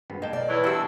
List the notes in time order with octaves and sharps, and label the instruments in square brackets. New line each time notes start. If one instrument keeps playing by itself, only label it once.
[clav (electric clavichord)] G#1 G2 B3
[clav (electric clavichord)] A#3 G5 A5 [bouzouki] D#4
[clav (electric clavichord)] B1 [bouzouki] A#4 D5
[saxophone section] E2 E3 [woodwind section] A3 C#5 E6
[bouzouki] G3 A#4 [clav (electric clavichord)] D4 F#4 G5 [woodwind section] A5 E6